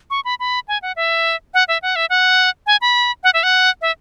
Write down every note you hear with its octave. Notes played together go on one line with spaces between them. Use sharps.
C#6
B5
B5
G#5
F#5
E5
F#5
E5
F#5
E5
F#5
G#5
B5
F#5
E5
F#5
E5